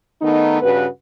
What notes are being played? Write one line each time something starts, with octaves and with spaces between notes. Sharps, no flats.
D#3 A3 B3 D#4
G2 C#3 F#4 B4